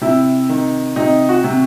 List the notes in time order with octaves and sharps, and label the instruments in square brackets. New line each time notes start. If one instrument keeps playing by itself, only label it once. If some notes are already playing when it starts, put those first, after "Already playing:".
[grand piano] C3 E4
D#3
C3 D#4
F#4
C3